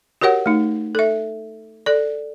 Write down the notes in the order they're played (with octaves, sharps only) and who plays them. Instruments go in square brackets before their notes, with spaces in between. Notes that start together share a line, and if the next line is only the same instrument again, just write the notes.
[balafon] F#4 G4 A#4 C#5 F#5
A3 D#4
A4 E5
A4 D5